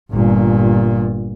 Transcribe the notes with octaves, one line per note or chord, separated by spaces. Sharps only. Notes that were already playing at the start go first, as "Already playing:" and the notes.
G1 A#2